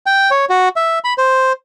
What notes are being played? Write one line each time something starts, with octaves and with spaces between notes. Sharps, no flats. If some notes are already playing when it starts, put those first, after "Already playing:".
G5
C#5
F#4
E5
B5
C5